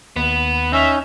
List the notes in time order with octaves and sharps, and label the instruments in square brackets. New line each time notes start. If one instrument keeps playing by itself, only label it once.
[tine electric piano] D#2 [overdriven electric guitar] B3
[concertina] C#4 [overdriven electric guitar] D#4 [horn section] E5